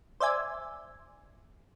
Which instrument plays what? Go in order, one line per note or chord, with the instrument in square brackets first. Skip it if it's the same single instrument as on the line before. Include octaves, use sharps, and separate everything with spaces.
[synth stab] C5 D5 E5 G#5